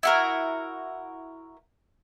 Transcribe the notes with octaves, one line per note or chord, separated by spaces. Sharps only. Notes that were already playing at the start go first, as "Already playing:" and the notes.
E4 F#4 A#4